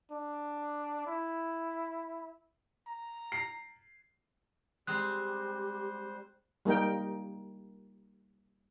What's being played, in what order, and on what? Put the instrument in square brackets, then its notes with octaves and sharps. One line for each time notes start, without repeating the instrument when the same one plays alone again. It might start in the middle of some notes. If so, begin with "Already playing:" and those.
[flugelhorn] D4
E4
[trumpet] A#5
[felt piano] C7
[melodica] G3 C5 [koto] G#3 C4 [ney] G4 [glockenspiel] F#6
[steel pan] G3 A#3 D#4 A#4 G5